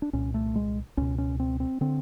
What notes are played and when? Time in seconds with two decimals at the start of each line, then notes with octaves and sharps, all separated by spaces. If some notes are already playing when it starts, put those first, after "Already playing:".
0.02 D4
0.13 C2 A#2 C#4
0.34 A3
0.56 G#3
0.97 C#2 B2 C#4
1.18 C#4
1.40 C4
1.60 C4
1.81 D3 C4